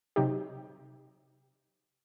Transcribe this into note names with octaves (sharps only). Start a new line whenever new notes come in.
C3 F#3 D#4 G4